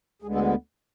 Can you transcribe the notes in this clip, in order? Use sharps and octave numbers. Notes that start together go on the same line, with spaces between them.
D2 D3 G#3 B3 G#4
A4